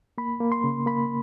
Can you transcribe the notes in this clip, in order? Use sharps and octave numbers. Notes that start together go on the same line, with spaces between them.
A#3 B5
A#3
C6
C#3
A#3 B5